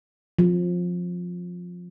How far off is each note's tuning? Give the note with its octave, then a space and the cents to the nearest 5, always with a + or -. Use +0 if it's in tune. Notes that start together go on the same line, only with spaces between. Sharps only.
F3 +20